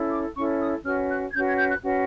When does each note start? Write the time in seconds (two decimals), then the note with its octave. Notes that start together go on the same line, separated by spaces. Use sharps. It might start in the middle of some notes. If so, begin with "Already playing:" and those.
Already playing: C#4 E4 A4
0.10 D6
0.35 C#4 E4 A4 C#6
0.60 D#6
0.84 C#4 F#4 B4 F6
1.10 F#6
1.29 G#6
1.34 C#4 F#4 B4 G6
1.46 G#6
1.58 G6
1.70 F#6
1.83 C#4 F#4 B4